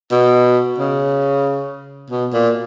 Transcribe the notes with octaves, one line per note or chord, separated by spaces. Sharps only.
B2
C#3
B2
A#2